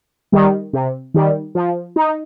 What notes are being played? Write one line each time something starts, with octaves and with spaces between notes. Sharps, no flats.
D#3 G3
C3
D#3 G3
F3
D#4